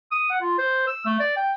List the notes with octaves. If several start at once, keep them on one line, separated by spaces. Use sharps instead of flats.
D#6
F#5
F4
C5
E6
A3
D5
G5